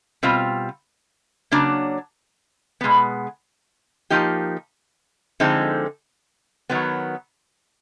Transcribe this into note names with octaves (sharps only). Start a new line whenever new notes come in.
B2 G3 C4 F4
C#3 F#3 A#3 D4
B2 G#3 B3
F3 A#3 D#4 G4
D3 F3 G#3 C4 D#4
D#3 F#3 B3